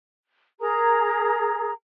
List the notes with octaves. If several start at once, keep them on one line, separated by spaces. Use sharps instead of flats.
G#4 A#4 A#5